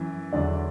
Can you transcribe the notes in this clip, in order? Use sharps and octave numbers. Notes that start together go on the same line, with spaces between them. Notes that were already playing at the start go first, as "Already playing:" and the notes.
Already playing: F#2 E3
E2 D3 F#3 D5